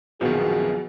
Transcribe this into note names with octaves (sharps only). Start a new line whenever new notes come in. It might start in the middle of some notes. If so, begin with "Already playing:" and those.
A#1 F#2 B2 D#3 F3 G#4